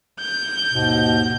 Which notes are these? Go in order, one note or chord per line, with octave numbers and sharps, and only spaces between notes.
G6
D#2 G#2 B2